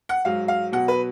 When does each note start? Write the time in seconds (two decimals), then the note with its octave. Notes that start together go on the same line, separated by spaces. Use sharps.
0.09 F#5
0.25 G#2 F#3 F5
0.48 F5
0.72 B2 F#3 F#5
0.88 B4